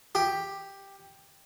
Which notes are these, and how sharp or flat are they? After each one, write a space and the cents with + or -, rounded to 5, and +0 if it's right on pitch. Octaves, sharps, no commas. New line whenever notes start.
G4 +5